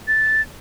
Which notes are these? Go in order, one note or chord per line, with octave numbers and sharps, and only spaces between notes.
A6